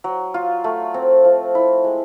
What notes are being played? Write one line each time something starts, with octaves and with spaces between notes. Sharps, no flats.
F#3
F4
A3
C4
F3
E4
G#3